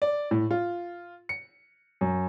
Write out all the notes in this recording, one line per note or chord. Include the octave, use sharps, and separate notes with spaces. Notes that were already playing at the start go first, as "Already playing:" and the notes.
D5
A2
F4
C#7
F#2